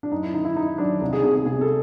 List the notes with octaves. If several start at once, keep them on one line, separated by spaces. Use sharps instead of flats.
D4
F#2 D#4
E4
D#3 D#4
E4
D#3 D#4
F#3 D4
C2 D#4
G#4
C3 G#4
G#4
C3 G#4
A4